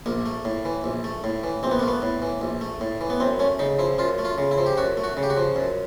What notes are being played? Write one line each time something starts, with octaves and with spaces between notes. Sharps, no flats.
A#1 A#3
A3
A2
E3
A#1
A3
A2
E3
A#1 C4
B3
A#3
A3 B3
A2
E3
A#1
A3
A2
E3
B3
F#2 C4
A3 C#4
C#3 D#4
F3 E4
F#2 F4
A3
F4
C#3
E4
F3
G4
F#2 F#4
A3
F#4
C#3
G4
F#4
F3
F#2